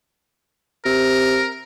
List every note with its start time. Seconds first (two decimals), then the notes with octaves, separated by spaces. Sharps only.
0.85 C3 A#4